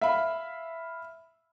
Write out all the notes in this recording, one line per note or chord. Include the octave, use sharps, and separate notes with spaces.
E5 F5 B5